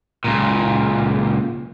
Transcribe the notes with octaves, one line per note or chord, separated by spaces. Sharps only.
C#2 A#2